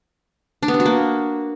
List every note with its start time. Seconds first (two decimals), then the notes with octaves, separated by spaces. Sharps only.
0.63 D4
0.68 B3
0.74 G3
0.80 F#4
0.86 A#3